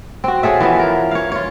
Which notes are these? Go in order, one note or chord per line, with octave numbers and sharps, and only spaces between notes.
C4 F#4
C#4 G#4 A4 E5
E3 F3 B3
A#4
C#5 F5
F4 C#5